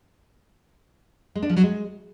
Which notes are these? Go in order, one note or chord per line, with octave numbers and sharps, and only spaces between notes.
G#3
D4
F3
F#3
G#3